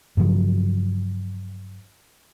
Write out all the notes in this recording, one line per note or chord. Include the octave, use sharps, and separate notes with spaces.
G2 C#3 F3 F#3